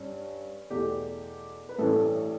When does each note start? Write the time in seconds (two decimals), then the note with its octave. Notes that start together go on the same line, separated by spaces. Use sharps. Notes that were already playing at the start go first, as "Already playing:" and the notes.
Already playing: G2 C#4
0.70 E2 B2 A3 G4
1.69 B4
1.78 A1 G2 E3 A3 C#4 A4